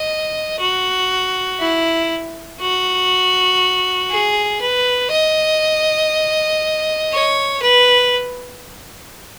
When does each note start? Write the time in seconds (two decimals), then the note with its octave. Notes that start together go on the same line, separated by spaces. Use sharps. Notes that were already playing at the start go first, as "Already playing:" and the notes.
Already playing: D#5
0.60 F#4
1.60 E4
2.60 F#4
4.10 G#4
4.61 B4
5.11 D#5
7.12 C#5
7.62 B4